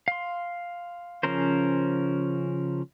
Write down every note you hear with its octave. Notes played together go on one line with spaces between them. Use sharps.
F5 C6
C#3 F3 C#4 A#4 C5